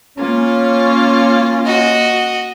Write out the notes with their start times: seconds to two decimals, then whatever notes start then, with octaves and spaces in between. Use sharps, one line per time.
0.16 A#3 C#4 F4
1.66 F#4 D#5